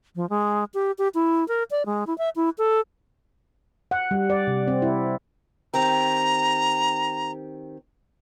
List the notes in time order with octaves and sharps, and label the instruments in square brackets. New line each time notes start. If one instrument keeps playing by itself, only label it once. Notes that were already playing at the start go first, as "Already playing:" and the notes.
[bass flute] F3
G#3
G4
G4
E4
A#4
D5
G#3
E4
E5
E4
A4
[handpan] F#5
G3
D5
C3
C4
E4
[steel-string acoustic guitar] D#3 C4 G4 [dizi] A#5